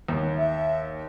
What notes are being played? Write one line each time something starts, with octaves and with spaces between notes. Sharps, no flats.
D#2
E5